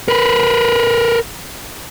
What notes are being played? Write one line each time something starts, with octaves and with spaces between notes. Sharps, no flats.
A#4 B4